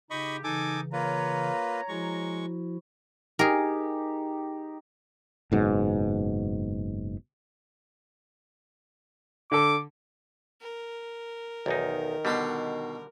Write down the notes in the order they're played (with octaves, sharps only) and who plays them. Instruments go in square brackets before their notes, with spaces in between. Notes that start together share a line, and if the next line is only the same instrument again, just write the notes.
[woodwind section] C#3 F4 G4 [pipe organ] D#4 [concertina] D#5 B5 C#6
[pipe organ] C#3 E3 [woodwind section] D#4 [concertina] A4 G#5 D6
[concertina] A#3 F4 B4 [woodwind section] C#5 A#5
[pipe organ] F3 E4 F#4 [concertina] G#3 C#6
[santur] D#4 G4 [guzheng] G#4 A#4
[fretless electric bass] F#1 G#2 B2
[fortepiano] D3 A4 [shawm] D6
[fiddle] A#4
[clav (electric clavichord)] B1 E2 D#4 [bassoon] D#3
[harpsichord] B2 B5 C6 [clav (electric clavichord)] D3 G3